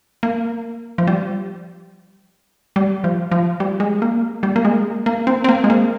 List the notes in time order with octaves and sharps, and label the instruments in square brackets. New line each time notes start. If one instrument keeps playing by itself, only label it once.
[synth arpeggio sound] A#3
F3
G3
G3
F3
F3
G3
G#3
A#3
G3
A#3
G#3
A#3
C4
C4
A#3
G#3
A#3